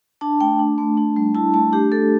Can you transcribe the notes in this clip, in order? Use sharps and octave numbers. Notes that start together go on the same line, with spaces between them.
D4 A5
A3 G5
D4
A3
D4
G3
E4 A5
A3 A5
D4 G4
A3 A4